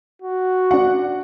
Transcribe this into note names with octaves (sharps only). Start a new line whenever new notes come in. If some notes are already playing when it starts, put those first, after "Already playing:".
F#4
D4 F#5